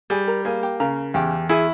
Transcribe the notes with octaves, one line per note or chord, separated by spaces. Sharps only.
G3 G#4 G#5
A#4 A#5
A#3 G#4 G#5
G4 G5
C#3 A#4 A#5
E2 G4 G5
E4 G#4 G#5